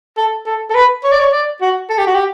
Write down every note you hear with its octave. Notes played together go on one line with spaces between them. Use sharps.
A4
A4
A4
B4
C#5
D5
C#5
D5
F#4
A4
G4
F#4
G4